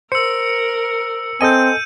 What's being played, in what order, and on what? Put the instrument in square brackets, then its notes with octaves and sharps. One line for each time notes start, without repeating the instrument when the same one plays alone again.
[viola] A#4 [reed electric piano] C5 [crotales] E6 C#7
[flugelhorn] C4 [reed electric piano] A4 D#5 G#5 [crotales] G6 D#7